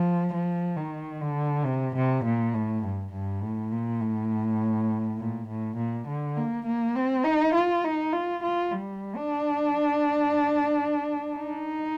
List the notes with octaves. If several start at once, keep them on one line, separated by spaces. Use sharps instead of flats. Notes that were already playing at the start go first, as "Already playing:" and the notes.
Already playing: F3
F3
D#3
D3
C3
C3
A#2
A2
G2
G2
A2
A#2
A2
A#2
A2
A#2
D3
A#3
A#3
C4
D#4
F4
D#4
F4
F4
G3
D4
D#4